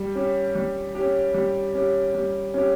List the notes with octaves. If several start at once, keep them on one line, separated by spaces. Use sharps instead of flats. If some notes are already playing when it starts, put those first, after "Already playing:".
Already playing: G3
C#4 G4
G3
G4
C#4
G3
C#4 G4
G3
C#4 G4